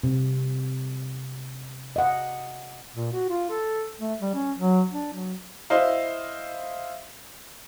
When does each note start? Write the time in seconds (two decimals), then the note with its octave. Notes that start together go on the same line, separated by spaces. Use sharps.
0.04 C3
1.96 D#5 F#5
2.94 A#2
3.12 F#4
3.29 F4
3.50 A4
4.00 A3
4.21 G3
4.34 C#4
4.58 F#3
4.92 D4
5.13 F#3
5.70 E4 C5 D#5 F5